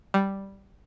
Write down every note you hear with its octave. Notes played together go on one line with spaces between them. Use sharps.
G3